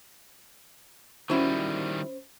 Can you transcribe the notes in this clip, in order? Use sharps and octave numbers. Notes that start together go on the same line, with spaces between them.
D#3 G3 C#4 E4 F#4 C5